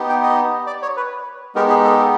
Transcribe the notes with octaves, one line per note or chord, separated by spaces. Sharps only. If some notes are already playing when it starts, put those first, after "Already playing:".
Already playing: B3 D#4 G4
G5
D#5
D5
C#5
B4
G#3 B3 D#4 G4 A#4
G#4
A4
A#4